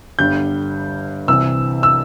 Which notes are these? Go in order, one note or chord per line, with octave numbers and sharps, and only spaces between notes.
G1 G2 D3 G3 G6
C2 C3 E3 E6
E6